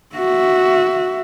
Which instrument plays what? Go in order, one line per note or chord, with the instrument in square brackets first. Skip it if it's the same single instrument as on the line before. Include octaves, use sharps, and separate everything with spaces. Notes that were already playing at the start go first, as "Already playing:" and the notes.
[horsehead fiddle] F#4 E5